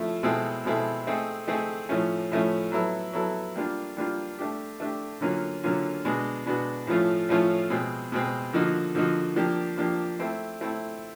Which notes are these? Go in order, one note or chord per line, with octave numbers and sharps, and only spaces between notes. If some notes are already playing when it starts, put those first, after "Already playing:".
Already playing: F3 A3 C#4 E4
B2 G#3 C4 E4 A4
B2 G#3 C4 E4 A4
A3 C4 D#4 G#4
A3 C4 D#4 G#4
A2 F3 A3 C#4
A2 F3 A3 C#4
F#3 B3 E4 A4
F#3 B3 E4 A4
G3 A#3 D4 F4
G3 A#3 D4 F4
A3 D4 G4
A3 D4 G4
D3 F#3 A#3 C#4 F4
D3 F#3 A#3 C#4 F4
B2 G#3 B3 D4 F#4
B2 G#3 B3 D4 F#4
A2 F3 A3 C#4 F4
A2 F3 A3 C#4 F4
B2 G#3 C4
B2 G#3 C4
D3 F3 A#3 D#4 F#4
D3 F3 A#3 D#4 F#4
F3 A#3 D4 G4
F3 A#3 D4 G4
A3 C4 E4
A3 C4 E4